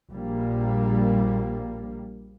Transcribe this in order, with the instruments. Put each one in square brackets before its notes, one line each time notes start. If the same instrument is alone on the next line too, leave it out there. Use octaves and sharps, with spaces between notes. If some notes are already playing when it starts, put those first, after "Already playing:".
[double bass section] A#1 G3 A#3